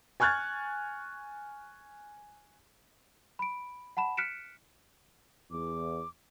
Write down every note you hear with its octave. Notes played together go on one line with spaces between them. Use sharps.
G#5 C#6 F6 F#6 G#6 A6
B5 D7
F#5 A5 B5 E7
F6 F#6 B6 C#7 D7 E7
E2 D6